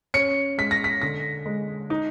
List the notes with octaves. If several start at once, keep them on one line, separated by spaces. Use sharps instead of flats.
C#4 C#7
G#3 B6
A#6
B6
D3 A#6
G#3
D#4